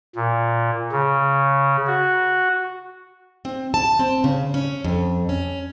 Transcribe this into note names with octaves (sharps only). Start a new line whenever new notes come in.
A#2
C#3
F#4
C4
A5
C4
C#3
C#4
F2
C#4